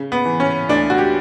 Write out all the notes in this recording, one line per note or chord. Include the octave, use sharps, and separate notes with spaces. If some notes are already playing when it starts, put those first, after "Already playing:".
Already playing: C#3
B3
E3
C#4
D2 D4
F#4
G4